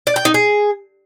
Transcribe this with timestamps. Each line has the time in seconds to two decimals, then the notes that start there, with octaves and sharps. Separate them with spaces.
0.07 D5
0.16 G5
0.25 D#4
0.34 G#4